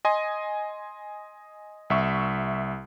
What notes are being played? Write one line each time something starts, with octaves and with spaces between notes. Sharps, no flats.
D#5 G#5 C6
C2 E5 C#6